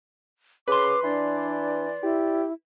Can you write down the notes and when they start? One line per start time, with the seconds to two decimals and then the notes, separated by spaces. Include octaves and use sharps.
0.68 C#3 B4 C6 D6
1.04 E3 D4 D5
2.02 E4 G4